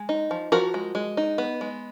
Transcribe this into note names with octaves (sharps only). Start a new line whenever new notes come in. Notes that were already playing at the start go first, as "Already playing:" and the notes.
Already playing: G#3
D#4
F3
F3 F#4 A#4
G#3
G#3
D#4
B3
G#3